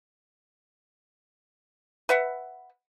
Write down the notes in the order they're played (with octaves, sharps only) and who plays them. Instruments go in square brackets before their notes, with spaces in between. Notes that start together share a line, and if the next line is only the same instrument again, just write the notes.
[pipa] B4 E5 F#5